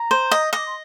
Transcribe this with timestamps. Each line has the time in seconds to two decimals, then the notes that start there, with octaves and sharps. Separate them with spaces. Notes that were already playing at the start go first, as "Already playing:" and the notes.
Already playing: A#5
0.11 C5
0.31 D#5
0.53 D#5 D6
0.66 C6